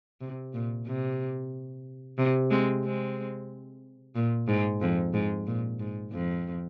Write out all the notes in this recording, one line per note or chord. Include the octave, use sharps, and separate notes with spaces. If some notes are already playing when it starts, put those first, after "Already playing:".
C3
A#2
C3
C3
G#3 C4
G#3 C4
A#2
G#2
F2
G#2
A#2
G#2
F2